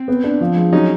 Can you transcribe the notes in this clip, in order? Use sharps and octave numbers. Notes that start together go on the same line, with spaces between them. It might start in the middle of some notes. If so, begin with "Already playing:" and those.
Already playing: C4
B3
D4
F3
G#3
F#3 C#4 D#4